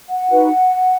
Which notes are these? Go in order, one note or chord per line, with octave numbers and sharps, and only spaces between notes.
F#5
D#4 F#4 B4